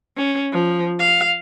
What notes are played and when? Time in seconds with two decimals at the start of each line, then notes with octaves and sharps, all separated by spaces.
0.17 C#4
0.53 F3
1.00 F5